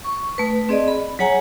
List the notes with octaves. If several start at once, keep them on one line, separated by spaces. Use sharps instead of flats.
C#6
A3 B4
C4 G#4 D5 D#5
B5
F#3 G#4 C#5 F#5 G#5 A#5